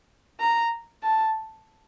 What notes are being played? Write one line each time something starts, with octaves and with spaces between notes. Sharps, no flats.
A#5
A5